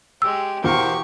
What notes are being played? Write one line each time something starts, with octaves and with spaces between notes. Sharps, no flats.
G#3 G4 E6
E2 B2 G4 A#4 C5 F5 C#6